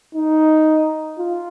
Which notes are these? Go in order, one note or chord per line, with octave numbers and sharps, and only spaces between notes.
D#4
F4